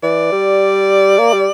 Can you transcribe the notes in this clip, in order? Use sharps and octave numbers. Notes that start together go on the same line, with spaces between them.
E3 D5
G3
A#3
G3